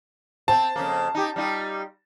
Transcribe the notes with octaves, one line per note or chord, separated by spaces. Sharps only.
C4 A5
F2 C#3 A#3
D#4 G4
G3 D#4 F4